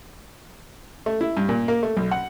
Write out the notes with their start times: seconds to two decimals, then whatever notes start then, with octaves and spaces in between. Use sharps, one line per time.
1.06 A3
1.21 E4
1.37 G2
1.49 A#2
1.68 A#3
1.83 A3
1.97 B1
2.11 F#5